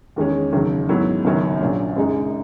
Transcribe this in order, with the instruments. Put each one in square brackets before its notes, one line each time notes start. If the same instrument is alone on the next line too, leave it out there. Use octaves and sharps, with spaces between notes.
[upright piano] E2 D#3 G#3 C#4
F#1 E2 D#3 F#3
G#2 D#3 F#3 B3 E4
F#1 F#2 D#3 F#3 B3
A#1 A#2 F#3
F#2 C#3 G#3 D#4